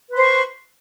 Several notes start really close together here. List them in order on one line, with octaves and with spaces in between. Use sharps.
B4 C6 C5 C#6